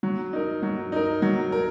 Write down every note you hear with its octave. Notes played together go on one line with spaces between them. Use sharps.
F#3
D#4 A#4
F#3
D#4 A#4
F#3
A#4